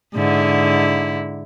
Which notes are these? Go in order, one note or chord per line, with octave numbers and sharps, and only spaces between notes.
G#2 D3 E4